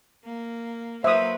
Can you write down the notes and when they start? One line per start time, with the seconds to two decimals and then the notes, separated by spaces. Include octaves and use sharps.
0.25 A#3
1.04 F#3 A#3 B4 C5 E5 D#6